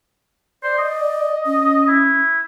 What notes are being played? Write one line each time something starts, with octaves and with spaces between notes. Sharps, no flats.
C5 D5
D#5
C#4
E4